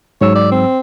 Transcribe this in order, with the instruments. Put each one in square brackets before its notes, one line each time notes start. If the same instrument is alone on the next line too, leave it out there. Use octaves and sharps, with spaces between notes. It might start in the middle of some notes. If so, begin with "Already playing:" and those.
[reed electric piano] G#2 F#3 E6 [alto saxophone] C#5
[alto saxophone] D5
C4